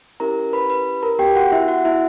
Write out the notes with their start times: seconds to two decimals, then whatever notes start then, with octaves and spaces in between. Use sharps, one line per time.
0.20 C#4 E4 G4 A#4 A#5
0.53 B4 B5
0.70 B4 B5
1.03 A#4 A#5
1.19 B3 G4 G5
1.23 F#4
1.36 F#4 F#5
1.52 E4 E5
1.68 F#4 F#5
1.85 E4 E5